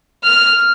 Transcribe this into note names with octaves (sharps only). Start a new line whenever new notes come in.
F6